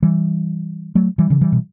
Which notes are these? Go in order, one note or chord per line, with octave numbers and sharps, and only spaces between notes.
E3 G3
F#3 A3
E3 G3
C#3 E3
E3 G3
B2